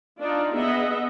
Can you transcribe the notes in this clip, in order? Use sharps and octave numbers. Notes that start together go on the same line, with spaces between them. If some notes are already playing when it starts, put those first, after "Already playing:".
D4 D#4 F4 D5
B3 G#4 D#5 E5 F#5